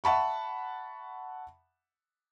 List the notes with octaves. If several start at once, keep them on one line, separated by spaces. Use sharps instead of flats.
E5 F#5 A5 B5 C#6